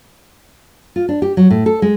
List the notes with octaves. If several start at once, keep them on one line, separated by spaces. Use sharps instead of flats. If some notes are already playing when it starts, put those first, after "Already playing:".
F4
D4
G4
F#3
A2
A4
G#3